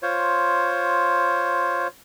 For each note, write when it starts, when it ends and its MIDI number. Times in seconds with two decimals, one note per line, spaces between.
0.03 1.87 65
0.03 1.87 72
0.03 1.87 73